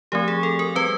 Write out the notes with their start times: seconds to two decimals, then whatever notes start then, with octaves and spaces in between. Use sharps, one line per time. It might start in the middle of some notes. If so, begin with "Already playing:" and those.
0.12 F3 A3 C4 G4
0.28 G#4
0.43 A4
0.59 A#4
0.75 G3 C4 B4